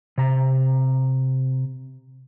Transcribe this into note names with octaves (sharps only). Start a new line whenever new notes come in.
C3 A#5